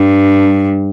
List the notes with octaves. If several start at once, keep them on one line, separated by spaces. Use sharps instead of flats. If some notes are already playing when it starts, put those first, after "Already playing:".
Already playing: G2